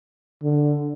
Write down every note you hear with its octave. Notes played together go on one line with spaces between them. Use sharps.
D3